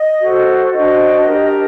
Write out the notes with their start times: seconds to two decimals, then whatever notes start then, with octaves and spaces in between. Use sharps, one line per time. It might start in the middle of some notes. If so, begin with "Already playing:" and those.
Already playing: D#5
0.21 F#4 A4 C5
0.73 D4 F#4 C5 D#5
1.26 D4 G4 A#4